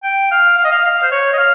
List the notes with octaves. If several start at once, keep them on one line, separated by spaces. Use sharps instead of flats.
G5
F5
F5
D#5
F5
F5
C5
C#5
D#5
F5